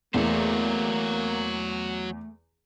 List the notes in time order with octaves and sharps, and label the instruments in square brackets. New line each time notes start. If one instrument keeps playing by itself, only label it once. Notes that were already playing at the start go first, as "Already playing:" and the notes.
[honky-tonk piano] E2 [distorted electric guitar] F#3 C5 [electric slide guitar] A3 [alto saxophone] A#3